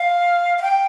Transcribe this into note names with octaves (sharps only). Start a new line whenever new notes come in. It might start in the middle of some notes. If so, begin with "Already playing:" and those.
Already playing: F5
F5
G5